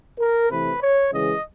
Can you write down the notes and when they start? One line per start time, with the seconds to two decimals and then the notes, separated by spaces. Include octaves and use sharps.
0.19 A#4
0.50 C3 E3 A3 B4
0.81 C#5
1.13 C#3 E3 G#3 D#5